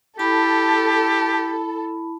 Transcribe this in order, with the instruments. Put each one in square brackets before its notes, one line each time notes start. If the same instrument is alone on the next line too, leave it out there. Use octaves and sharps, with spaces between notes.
[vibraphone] E4 A5 B5 [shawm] G4 [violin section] A4